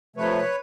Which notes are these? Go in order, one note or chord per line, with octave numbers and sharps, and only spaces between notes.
C3 F3 A3 B4 C#5